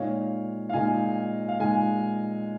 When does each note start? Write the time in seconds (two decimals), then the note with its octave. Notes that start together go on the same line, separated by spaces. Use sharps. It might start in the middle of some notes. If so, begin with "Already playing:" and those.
Already playing: A#2 G#3 D#4 C#5 F5
0.69 F5
0.73 A#2 G#3 D#4 D#5 G#5
1.48 F5
1.60 A#2 G#3 D#4 D#5 G#5